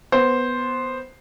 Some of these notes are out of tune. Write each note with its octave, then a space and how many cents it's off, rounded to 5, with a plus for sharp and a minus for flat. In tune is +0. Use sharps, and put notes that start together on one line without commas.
B3 +0 C5 +0